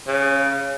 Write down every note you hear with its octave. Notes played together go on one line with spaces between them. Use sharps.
C#3